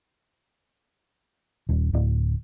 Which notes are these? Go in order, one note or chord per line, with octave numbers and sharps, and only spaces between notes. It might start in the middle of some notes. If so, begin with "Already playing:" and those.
D#1
D1